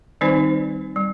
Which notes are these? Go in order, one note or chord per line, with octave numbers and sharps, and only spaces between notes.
D#3 G3 C4 D#4 C5
G3